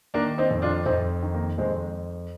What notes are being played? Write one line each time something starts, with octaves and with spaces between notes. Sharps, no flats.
D#3 A#3 D4
C4 D#4
F2
D4 F4
F2 C4 D#4
D#3
A#3
F2 G#3 C4